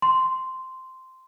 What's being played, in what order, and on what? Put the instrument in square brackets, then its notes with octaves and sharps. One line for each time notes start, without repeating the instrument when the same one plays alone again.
[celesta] C6